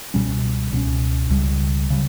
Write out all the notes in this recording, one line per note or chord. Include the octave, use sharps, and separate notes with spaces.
C#2 B2 G3 C#4
C#2 B2 G3 C#4
C#2 C#3 G3
C#3 G3